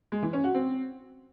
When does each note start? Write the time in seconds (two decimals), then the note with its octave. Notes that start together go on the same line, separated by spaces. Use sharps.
0.12 G#3
0.23 E3
0.33 C#4
0.44 F#4
0.54 C4